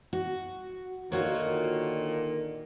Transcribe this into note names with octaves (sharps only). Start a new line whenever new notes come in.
F#4
A#2 D3 D#3 F4 F#4 C#5